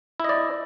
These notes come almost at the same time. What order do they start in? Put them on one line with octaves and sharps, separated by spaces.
E4 D#5 D5